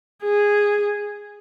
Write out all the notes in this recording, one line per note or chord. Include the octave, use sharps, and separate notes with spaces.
G#4